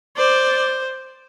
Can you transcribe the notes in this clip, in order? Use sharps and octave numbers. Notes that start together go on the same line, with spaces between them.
C5 D5